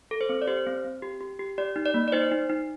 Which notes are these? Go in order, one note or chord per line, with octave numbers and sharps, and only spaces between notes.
A4
C5
C4
D5
G4 C5
C4
C4
G4
G4
G4
G4 D5
D#4
D5
A#3
D5
D#4 C5
D#4
D#4